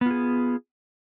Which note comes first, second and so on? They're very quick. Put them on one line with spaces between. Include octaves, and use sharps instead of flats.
B3 F4 G#4